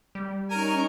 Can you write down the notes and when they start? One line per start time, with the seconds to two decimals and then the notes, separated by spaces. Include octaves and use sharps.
0.15 G3
0.51 C#4 D#4 A#4 G#5 A#5 C#6